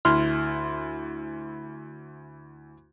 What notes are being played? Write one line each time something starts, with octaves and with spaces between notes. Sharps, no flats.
D2 E4 C6 F6